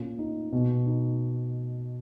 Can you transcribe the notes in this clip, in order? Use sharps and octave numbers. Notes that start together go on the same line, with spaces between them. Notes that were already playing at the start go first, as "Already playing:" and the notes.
Already playing: A#2 C#4
D#4
B2
D#4